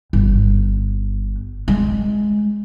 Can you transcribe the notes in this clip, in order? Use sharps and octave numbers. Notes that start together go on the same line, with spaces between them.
G1
G#3